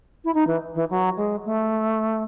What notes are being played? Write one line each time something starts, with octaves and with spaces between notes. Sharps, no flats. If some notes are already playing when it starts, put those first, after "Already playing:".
E4
D#4
E3
E3
F#3
G#3
A3